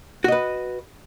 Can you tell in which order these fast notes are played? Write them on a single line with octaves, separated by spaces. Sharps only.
F#4 D#5 B4